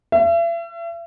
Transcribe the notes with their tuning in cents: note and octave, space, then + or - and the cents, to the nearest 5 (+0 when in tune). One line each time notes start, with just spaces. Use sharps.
E5 +40